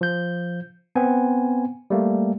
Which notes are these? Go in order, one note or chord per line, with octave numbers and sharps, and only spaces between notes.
F3 G6
B3 C4 G#5
G3 A3 A#3